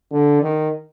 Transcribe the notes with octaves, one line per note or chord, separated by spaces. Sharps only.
D3
D#3